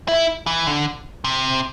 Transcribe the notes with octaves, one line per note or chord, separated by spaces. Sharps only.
E4
E3
D3
C3